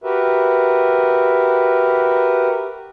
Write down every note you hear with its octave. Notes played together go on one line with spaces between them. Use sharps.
F#4 G4 A#4 B4 E5